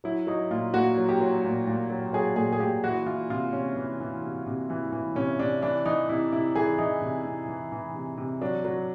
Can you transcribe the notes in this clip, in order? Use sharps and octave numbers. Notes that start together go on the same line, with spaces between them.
F#3 E4
F#3 D#4
A#2 F4
A#2 F#4
F#3
G4
F#3
A#2
A#2
F#3
F#3 G#4
A#2 G#4
G#4
A#2 G4
E3 F#4
E3 F4
C3 F4
C3 C#4
E3
E3
C3
C3
E3
E3
C3 C#4
C3 D4
E3 D4
E3 D#4
C3 E4
C3 E4
E3 G#4
E3 D#4
C3
C3
E3
E3
C3
C3
F#3 D4
F#3